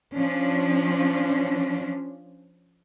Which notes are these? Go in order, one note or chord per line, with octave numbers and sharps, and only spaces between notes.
F3 C#4 D4